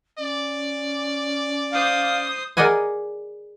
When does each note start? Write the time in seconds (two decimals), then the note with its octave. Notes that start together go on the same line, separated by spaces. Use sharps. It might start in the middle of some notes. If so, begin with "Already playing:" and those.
0.19 C#4 D5
1.72 C5 F5 D#6
2.57 G#4 A#4 D5 D#5 F#5 G#5